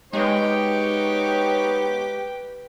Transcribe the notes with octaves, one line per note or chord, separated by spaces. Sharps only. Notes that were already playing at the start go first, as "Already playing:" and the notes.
G#3 B3 D#4 G4 B4 C#5 G5